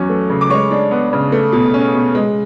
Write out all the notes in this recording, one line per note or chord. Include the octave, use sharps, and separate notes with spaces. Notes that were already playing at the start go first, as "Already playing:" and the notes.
Already playing: E2 F#3 C#4
A3
C#3
D6
G#3 C#5 C#6
D4
B3
C#3
A3
B2
C#4
B2
G#3